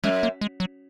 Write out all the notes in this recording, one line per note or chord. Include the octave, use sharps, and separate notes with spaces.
F#2 G#3
A#3
G#3
F#3